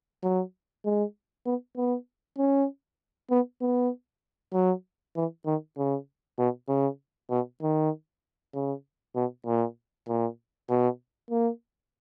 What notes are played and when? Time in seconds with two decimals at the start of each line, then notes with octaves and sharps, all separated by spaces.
0.23 F#3
0.85 G#3
1.45 B3
1.77 B3
2.38 C#4
3.31 B3
3.61 B3
4.53 F#3
5.16 E3
5.46 D#3
5.77 C#3
6.39 B2
6.69 C#3
7.30 B2
7.62 D#3
8.54 C#3
9.16 B2
9.46 A#2
10.08 A#2
10.70 B2
11.31 A#3